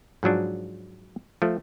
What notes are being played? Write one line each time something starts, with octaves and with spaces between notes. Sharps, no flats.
G#2 F3 F#3 D4
F3 A3